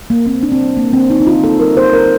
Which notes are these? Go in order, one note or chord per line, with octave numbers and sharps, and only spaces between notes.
A#3
A#3 C4
A#3 D4
C4
G3
D3 A#3
D3 C4
A#3 D#4
D#4
D3 F4
A#3 A4
G3 A#4
A#3 C5
A#3 A#4